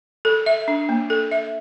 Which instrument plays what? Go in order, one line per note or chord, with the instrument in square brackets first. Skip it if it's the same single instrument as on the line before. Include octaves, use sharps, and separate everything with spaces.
[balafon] A4
E5
D4
A#3
A4
E5